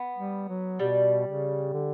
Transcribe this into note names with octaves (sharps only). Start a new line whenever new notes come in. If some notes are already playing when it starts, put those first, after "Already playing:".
Already playing: B3
G3
F#3
B2 G3
C#3
D3